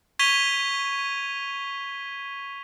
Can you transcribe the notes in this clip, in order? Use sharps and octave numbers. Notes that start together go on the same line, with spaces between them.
C#6 G#6 B6 D#7 F7 G7